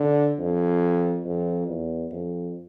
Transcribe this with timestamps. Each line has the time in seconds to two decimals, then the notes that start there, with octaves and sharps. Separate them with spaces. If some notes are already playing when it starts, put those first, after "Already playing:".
Already playing: D3
0.39 F2
1.25 F2
1.68 E2
2.12 F2